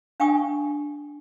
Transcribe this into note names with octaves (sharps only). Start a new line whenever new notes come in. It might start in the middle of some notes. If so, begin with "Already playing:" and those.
D4 F5 G5 G#5 C#6 D#6